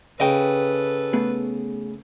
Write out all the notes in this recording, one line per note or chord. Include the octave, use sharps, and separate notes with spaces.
C#3 A4 B4 D#5 G5
A3 B3 G#4